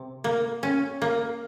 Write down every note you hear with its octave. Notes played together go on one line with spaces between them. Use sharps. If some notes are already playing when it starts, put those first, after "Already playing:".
Already playing: C3
A#3
C#4
A#3